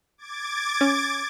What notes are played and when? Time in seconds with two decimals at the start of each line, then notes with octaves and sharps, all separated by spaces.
0.18 D6 G#6 A6
0.81 C#4